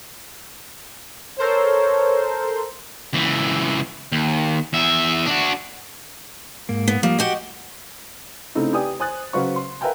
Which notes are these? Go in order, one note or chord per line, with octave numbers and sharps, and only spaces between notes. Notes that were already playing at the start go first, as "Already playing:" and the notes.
A4 A#4 C5 C#5
C#2 E3
D#2
E2 E5
D4 F#4
G#2 A#3
B3
F3 G3 A#3
F#4 G4 D#5 F#5
C#3 A3 C4 D#4 E4
G4 B4 D5 G5 G#5 D#6
C5 G#5 D#6 F#6 A6
C#3 F#3 B4 C5 F5 C#6
C6
A#4 B4 E5 F5 G5 G#5